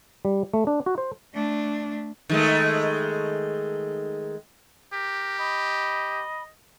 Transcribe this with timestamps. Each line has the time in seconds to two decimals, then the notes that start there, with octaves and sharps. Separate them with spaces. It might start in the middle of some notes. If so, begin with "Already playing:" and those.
0.25 G3
0.54 A3
0.67 D4
0.86 F#4
0.98 C5
1.34 A3 D4
2.29 D#3 G#3 A3
4.93 G4 A#4
5.39 D#5 B5